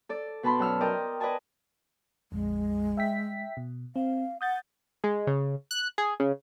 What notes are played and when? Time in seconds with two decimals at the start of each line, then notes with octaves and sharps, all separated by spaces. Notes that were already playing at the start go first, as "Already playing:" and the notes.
0.09 A4 D5
0.43 B2 B4 A5 B5 C6
0.59 F#2 F#5 E6 F6
0.81 A#4 D5 D#5 G5
1.20 B4 D5 D#5 G#5 A5
2.32 A#1 F2 G#3
2.97 E5 G5 B6
3.57 B2
3.96 C4 F5
4.41 F#5 D#6 G6 A6
5.04 G#3
5.27 C#3
5.71 F#6
5.98 G#4
6.20 C#3